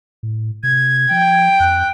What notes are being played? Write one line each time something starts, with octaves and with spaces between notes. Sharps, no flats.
A2
C3 G#6
F3 G5
F2 F#6